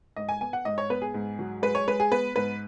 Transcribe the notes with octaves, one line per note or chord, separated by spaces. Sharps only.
G#2 D#5
G#5
B3 G#5
F#5
G#2 D#5
C#5
B3 B4
G#4
G#2
F#3
G#3 B4
C#5
G#3 B4
G#4
B3 B4
G#2 B4